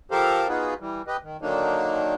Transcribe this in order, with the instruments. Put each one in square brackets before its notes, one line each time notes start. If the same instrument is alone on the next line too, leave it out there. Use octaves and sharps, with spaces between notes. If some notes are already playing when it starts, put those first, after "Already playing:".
[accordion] F3 G4 A4 A#4 C5 F5
B3 D#4 F4 F#4 G#4 B4
E3 G3
G4 B4 D#5
D#3
D3 D#3 F#3 A#3 D4 D#4